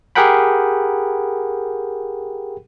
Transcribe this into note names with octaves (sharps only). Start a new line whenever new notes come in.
G4 G#4 A#4 F#5 G5 B5